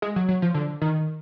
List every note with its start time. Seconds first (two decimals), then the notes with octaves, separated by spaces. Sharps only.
0.02 G#3
0.16 F#3
0.29 F#3
0.42 F3
0.54 D3
0.82 D#3